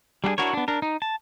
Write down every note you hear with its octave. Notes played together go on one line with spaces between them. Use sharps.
G3 D4 F#4 G#4
D4 E4 F#4 A#4 C#5
B3 D4
D4 A#4
D#4
A5